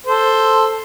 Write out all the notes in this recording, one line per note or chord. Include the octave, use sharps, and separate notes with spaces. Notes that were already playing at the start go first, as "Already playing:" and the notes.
A4 C5